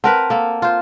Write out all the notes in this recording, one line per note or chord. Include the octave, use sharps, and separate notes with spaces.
C4 A#4 B4 F#5 A5
A#3 A4
F4 C5